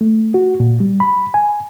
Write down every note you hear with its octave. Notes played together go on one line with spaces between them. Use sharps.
A3
F#4
A#2
G3
B5
G#5